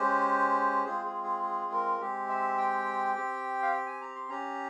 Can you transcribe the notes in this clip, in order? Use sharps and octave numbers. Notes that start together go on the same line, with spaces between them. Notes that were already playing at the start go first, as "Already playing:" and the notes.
Already playing: G#3 C#4 G4 C5
G#3 C4 F4 G#4 C5
G#4
G#4
G#4
A#4
G#3 C4 G4
E5
G5
C4 G4
F5
G5
G#5
A#5
C6
C#4 G4 A#5